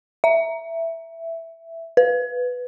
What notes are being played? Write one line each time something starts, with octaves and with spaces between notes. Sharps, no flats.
E5
B4